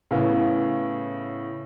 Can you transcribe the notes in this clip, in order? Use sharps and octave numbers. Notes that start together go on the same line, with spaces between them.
A2 C#3 B3